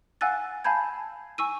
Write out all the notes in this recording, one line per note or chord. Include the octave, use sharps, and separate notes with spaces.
F5 F#5 G#5 E6 F#6 A6
F5 G#5 A5 B5 G6 G#6
G#5 C#6 E6 D#7